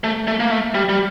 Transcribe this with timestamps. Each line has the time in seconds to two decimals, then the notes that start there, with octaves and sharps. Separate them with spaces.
0.04 A3
0.28 A3
0.40 A#3
0.51 A3
0.75 G3
0.89 G3